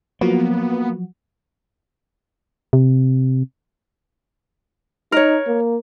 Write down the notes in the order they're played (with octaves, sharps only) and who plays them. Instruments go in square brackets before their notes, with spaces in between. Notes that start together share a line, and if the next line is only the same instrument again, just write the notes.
[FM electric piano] F3 F#3 F#4 [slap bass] A#3 [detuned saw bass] B3
[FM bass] C3
[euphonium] D#4 [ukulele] A#4 C#5
[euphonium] A#3